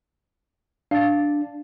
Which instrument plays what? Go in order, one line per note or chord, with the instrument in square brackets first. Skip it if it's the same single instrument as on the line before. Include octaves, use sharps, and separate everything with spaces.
[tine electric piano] D4 [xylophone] F5 A6